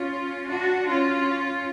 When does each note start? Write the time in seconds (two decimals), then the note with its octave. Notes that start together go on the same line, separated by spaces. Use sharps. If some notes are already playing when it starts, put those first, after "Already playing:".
Already playing: C#4 F4
0.47 D4 F#4
0.87 C#4 F4